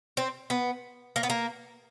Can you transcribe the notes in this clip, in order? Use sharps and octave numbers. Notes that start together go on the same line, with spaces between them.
C4
B3
A#3
B3
A#3